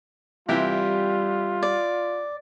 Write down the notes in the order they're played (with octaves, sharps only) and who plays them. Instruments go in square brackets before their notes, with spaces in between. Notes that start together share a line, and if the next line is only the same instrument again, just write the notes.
[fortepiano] C3 E3 G4 [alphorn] G3 [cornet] F4
[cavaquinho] D5